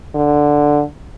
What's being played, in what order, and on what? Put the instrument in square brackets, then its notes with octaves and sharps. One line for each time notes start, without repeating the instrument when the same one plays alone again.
[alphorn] D3